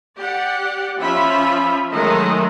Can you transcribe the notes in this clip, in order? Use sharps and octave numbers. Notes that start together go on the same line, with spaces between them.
G4 D5 F#5
F3 C#4 F4 E5 B5
D#3 F#3 G#3 A3 D#5 E5